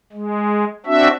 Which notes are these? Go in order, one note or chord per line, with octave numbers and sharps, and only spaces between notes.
G#3
C4 D4 F#4 E5